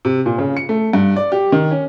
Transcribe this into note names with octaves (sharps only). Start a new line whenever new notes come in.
C3
A#2
C#3
C#7
A3
G2
D5
G4
D#3
C#4